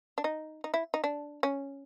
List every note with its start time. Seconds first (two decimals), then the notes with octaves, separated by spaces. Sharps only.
0.18 D4
0.24 D#4
0.64 D#4
0.74 E4
0.94 D#4
1.04 D4
1.43 C#4